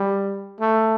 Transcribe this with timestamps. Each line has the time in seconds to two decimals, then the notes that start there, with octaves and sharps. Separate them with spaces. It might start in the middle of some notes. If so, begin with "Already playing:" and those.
Already playing: G3
0.60 A3